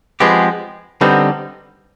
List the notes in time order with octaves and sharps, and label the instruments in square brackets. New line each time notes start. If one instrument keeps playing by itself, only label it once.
[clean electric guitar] F3 G#3 C4 G4 [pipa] B3
[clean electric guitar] D3 G3 C4 D#4 [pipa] B3